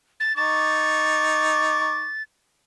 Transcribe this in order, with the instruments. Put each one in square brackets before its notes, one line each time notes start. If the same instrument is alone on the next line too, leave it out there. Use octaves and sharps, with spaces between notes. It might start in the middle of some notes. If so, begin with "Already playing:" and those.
[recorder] A6
[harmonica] D#4 C#6 D6 [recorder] A6